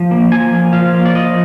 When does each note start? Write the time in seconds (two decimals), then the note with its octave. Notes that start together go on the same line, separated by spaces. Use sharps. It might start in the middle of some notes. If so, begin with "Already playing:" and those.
Already playing: F3
0.11 A#3
0.31 F3 G#5
0.52 A#3
0.73 F3 F5
0.94 A#3
1.06 D5
1.14 F3 D#5